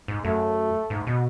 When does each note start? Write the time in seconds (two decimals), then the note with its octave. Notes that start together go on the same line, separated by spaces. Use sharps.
0.08 G#2
0.25 F#2 A3
0.90 G#2
1.07 B2